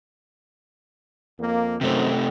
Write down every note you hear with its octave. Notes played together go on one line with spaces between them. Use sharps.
F2 A#3
F#2 C3 D#3 A3 C5